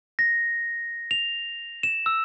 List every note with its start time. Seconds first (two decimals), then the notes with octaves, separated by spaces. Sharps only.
0.19 A#6
1.11 F7
1.83 E7
2.06 E6